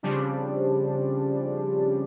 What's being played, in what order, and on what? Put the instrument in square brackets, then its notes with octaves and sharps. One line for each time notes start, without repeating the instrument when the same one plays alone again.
[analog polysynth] C#3 F3 G3 C4 D4